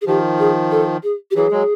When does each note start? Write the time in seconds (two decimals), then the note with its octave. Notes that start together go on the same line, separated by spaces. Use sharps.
0.01 G#4
0.07 D#3 F3 G4
0.39 G#4
0.71 A4
1.03 G#4
1.31 G4
1.36 E3 F#3 G#4
1.51 F#3 G#3